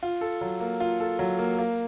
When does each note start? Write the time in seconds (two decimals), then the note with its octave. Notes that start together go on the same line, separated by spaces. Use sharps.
0.03 F4
0.21 A4
0.41 F#3
0.60 A#3
0.80 F4
1.00 A4
1.19 F#3
1.39 A#3
1.58 A#3